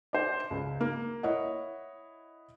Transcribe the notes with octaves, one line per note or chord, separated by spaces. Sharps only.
C5 D5
C#2
A#3
E4 C#5 D#5 F#5